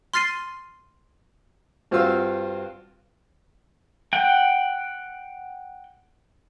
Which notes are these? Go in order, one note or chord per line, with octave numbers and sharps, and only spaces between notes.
C6 F6 A6 C7 D#7
G2 C4 F4 F#4 F5 E6
F#5 G5